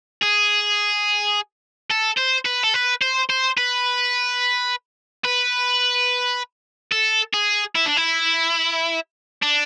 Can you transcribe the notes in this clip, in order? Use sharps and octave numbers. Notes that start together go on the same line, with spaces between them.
G#4
A4
C5
B4
A4
B4
C5
C5
B4
B4
A4
G#4
E4
D4
E4
D4